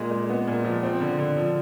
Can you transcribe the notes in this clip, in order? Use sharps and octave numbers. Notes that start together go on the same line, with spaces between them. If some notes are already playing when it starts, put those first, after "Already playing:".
Already playing: A#2 G#3
G#3
B3
A#2
F3
C4
D3
D3
F3